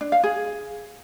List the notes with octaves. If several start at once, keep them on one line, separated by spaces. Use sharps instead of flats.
D4
F5
G#4